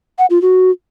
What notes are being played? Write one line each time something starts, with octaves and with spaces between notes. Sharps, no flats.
F#5
F4
F#4